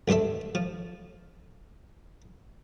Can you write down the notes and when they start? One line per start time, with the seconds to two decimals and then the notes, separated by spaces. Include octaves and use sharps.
0.08 D2 G2 G3 A4 E5
0.55 F3